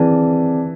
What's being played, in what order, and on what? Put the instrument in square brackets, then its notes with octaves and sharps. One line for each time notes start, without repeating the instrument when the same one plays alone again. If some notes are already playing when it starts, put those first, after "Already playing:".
Already playing: [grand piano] E3 [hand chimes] C4 G#4 D5 A5